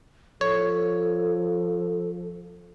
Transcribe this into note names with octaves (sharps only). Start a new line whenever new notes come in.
F3 A4 C#5